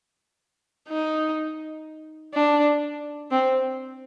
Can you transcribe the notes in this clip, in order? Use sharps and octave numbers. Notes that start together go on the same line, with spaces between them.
D#4
D4
C4